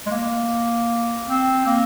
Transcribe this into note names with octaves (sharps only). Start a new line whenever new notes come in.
G#3
A#3
C4
A#3